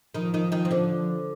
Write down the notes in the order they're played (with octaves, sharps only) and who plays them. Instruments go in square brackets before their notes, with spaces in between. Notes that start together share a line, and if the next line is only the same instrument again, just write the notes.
[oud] D#3 D#4 [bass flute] F3
[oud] D#3 D#4
D#3 D#4
C4
D3 D4